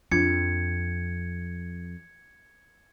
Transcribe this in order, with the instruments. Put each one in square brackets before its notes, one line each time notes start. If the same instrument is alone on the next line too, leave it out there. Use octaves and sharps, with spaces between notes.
[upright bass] F2 [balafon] D4 F4 [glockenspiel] G#6 C#7